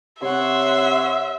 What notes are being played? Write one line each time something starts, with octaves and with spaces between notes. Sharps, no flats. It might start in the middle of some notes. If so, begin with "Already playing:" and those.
C3 C#5 E5 F#5 C6